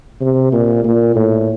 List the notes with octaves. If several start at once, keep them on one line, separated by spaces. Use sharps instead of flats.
C3
A#2
A#2
A2